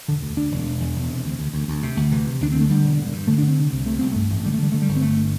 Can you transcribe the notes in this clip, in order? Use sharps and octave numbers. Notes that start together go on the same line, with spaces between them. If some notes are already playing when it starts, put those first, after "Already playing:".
E1 D3
D2
D2 D4
E1
E1
E2
E1
C3
D2
D2
D2
D2
C3
D2
C3 E3
C3
D2 D4
D3 C4
A3
D3 G3
E1
G2
G2
D3 A3
D4
D3
C4
C3
C2
C3 A3
C2 C4
G2 A3
A1
D3 G3
A3
D3 G3
D3 A3
G3
G1
C4
G1 A3